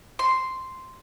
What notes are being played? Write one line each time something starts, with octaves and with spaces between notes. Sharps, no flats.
C6